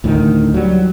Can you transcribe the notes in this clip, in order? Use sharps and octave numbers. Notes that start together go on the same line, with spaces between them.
D2 A2 D#3
F#3 G3